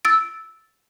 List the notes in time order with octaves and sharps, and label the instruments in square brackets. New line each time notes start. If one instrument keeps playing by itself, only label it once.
[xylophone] E6 A6 D7